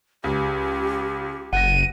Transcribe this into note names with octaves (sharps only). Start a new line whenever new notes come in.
C#2 G4
F#1 F#5 A#6 D#7